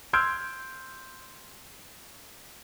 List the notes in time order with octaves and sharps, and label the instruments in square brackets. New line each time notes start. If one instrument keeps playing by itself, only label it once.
[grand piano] C6 E6 F6 G6 G#6 D7